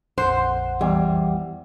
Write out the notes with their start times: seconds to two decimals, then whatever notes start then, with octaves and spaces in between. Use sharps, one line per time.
0.18 A#1 F2 C5 F#5
0.81 E2 G3